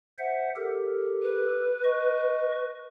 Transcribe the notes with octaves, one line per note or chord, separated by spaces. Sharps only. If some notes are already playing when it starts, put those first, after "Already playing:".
C5 E5 F#5
G4 A4 A#4
B4
D#5 C#6